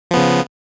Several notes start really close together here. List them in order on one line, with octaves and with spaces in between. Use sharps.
F3 B3 C#3